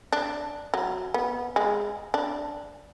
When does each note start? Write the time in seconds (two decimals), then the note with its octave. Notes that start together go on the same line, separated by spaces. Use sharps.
0.13 D4
0.74 F#3
1.14 B3
1.56 G#3
2.14 D4